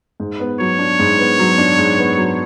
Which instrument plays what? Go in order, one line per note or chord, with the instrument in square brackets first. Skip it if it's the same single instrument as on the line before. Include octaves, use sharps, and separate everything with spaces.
[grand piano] G#2
B3
[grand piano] F#3 [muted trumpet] C#5
[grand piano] D4
G#2
B3
F#3
D4
G#2
B3
F#3